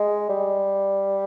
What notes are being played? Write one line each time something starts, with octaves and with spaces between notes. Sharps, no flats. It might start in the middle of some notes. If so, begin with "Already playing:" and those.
Already playing: G#3
G3